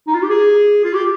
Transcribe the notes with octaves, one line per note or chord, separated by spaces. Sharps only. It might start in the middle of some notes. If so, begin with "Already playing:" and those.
D#4
F4
G4
G#4
F4
G4